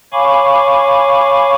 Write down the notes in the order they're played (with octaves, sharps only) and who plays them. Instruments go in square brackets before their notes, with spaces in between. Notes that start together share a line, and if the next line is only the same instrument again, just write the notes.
[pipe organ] C#5 F5 G#5 B5 C#6 D6